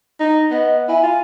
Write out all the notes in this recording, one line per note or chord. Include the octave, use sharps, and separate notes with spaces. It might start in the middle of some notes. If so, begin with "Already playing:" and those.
D#4
B3 D#5
E4 G#5
F4